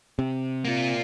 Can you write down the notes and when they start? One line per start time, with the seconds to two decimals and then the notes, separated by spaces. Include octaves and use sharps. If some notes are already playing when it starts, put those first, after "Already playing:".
0.19 C3
0.65 A#3 F4